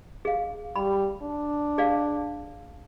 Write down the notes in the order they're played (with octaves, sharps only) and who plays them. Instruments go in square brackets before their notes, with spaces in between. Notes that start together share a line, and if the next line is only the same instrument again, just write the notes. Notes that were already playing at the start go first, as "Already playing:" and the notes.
[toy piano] G#4 F5
[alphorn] G3 [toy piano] B5
[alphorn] D4
[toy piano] G#4 D5 F5